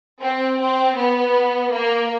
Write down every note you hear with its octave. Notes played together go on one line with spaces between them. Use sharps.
C4
C4
B3
A#3